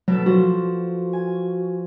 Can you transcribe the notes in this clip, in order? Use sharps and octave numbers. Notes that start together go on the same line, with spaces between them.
B2 F#3 A4
F3 F#4
G#5